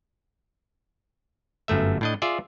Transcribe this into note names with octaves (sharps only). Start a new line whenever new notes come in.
G1 F#2 A3 E5
A2 D4 D#5
F4 G#4 D5 E5